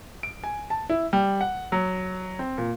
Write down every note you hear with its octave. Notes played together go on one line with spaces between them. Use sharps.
D7
G#5
A5
E4
G3
F#5
F#3
C4
A#2